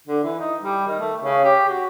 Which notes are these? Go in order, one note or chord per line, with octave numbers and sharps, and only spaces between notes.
D3
E3
D#4
G3
D#3
A3
C#3
G4
F#4